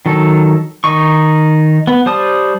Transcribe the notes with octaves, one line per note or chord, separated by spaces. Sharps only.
D#3 F#3 A4
D#3 D#4 C#6
B3
G3 C5 A5 D#6